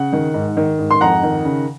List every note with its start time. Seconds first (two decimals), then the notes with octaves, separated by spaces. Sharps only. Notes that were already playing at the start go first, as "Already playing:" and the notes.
Already playing: C#3 F#5
0.13 D#3
0.34 G#2
0.57 D#3
0.79 G#2
0.91 C6
1.01 F2 F#5 A#5
1.23 D#3
1.45 C#3